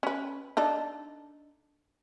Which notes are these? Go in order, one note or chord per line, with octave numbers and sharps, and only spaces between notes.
C#4 B4
D4 D#4 A4